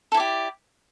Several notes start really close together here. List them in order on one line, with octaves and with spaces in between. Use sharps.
A4 E4 D5 G4